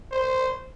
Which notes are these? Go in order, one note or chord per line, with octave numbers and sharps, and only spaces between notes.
C5